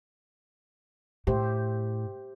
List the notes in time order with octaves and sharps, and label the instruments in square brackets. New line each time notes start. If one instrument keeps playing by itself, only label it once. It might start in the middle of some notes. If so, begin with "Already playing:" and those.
[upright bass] A2 [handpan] G4 C5 E5